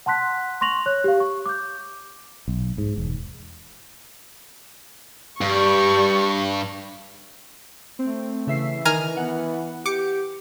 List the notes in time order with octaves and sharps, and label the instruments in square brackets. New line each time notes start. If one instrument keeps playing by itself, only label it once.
[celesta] F#5 A5 C6 F#6 B6
C6 C#6 A#6 F7 F#7
C#5 F#6
G4 F5
C#6
D6 G6
[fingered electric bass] B1
G#2
E1
[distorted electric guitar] G2 [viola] G3 C#6
[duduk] A3 [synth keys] C4
[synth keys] C#3 E5 C7 [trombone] E3
[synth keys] D#3 [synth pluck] G#5 A#5 F6
[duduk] B3 [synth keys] F#5
[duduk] G4 [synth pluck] D6 C#7